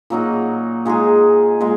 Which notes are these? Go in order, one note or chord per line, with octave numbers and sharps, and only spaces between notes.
A#2 F#3 A#3 D#4
A#2 G#3 D#4 G#4
A#2 G#3